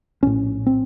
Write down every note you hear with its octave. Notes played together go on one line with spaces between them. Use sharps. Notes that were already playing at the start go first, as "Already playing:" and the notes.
A#1 A2 C#4
C4